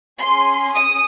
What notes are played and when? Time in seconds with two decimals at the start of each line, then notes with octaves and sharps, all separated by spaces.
0.22 C#4 G#4 C6
0.75 D#6